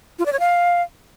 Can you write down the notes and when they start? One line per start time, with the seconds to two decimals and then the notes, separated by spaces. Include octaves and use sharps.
0.19 F4
0.26 D5
0.33 C#5
0.40 F5